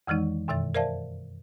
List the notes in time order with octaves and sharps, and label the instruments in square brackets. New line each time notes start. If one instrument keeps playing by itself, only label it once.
[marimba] F2 D#3 E3 G#3 D#4
F#2 B2 D#3 E5 A6
A#4 C5 D5 E5 F5 A5